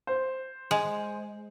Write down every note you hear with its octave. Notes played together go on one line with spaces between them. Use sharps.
C5
G#3